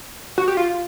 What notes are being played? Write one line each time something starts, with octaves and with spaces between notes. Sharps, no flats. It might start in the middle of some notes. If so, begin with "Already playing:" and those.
F#4
G4
F4